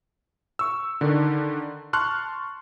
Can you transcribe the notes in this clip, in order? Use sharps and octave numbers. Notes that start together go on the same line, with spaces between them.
C#6 E6
D3 D#3 D4
A5 C6 C#6 F6 F#6